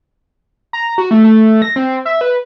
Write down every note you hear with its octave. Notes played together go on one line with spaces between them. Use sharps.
A#5
F#4
A3
A3
A#6
C4
E5
B4